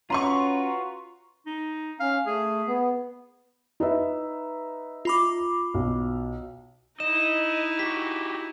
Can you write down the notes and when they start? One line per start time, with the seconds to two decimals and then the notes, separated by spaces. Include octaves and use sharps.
0.10 C#4 F4 F#4 B4 A#5 C6 C#6
1.46 D#4
2.00 C#4 F5
2.26 A3 G#4
2.67 B3
3.80 D#4 B4 E5
5.05 F4 B5 D6
5.74 B1
7.00 D#4 E4 D#5 E7
7.79 F#4 G4 B6